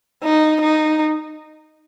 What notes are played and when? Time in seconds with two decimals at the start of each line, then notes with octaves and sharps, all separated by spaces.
0.23 D#4
0.62 D#4